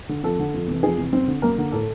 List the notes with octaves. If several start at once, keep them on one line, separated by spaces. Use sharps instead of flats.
D3
F2 A4
D3
F2
C3 E3
F2 G#4
C3 E3
F#2 C4 C5
D3
F#2 A#3 A#4
D3
A2 A4